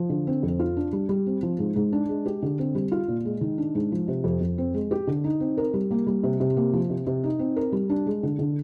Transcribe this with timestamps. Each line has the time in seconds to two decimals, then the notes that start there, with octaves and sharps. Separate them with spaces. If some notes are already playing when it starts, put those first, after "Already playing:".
Already playing: F3
0.10 D3
0.27 C4
0.43 F2
0.59 F4
0.77 D4
0.93 G3
1.09 G3
1.26 C4
1.43 F3
1.59 G#2
1.76 G#2
1.92 D4
2.09 G#3
2.26 G4
2.42 D3
2.59 C4
2.75 G3
2.92 F4
3.08 A#2
3.25 G#3
3.41 D#3
3.58 D4
3.75 G#2
3.92 F3
4.08 C3
4.24 F2
4.41 F2
4.58 C4
4.74 G#3
4.91 G4
5.07 D3
5.24 D#4
5.40 C4
5.57 A#4
5.74 G3
5.91 A#3
6.07 G3
6.23 C3
6.40 C3
6.57 A#3
6.73 F3
6.90 C3
7.07 C3
7.23 D#4
7.39 C4
7.56 A#4
7.72 G3
7.89 D4
8.06 G#3
8.23 D3
8.39 D3